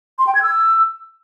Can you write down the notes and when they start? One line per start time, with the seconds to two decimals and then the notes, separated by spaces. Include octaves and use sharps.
0.19 C6
0.27 G5
0.35 G#6
0.43 E6